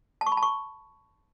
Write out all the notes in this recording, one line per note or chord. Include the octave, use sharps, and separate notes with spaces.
A5
C#6
B5
A5
C#6